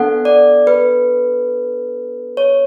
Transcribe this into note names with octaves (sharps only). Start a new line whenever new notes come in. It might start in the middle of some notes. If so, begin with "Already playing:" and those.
Already playing: B3 D4 A4 F#5
D5
B4
C#5